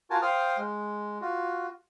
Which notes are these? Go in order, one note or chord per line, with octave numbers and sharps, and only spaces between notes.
F4 F#4 A#4 G#5 A5
C5 F5 G5 D#6 F6
G#3
F4 F#4